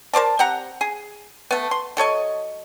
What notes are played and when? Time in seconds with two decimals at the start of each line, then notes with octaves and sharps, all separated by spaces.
0.13 A#4 C5 D5 A5
0.39 C4 G4 F#5 A#5
0.81 G#4
1.51 A3 B3
1.71 C6
1.97 F#3 A4 C#5 D#5